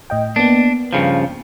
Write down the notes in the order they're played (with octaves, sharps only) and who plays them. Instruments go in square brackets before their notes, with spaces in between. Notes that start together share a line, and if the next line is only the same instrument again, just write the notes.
[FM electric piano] A2 D#5 G5
[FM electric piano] A#3 B3 [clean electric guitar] D4
[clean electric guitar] G2 C#3 F3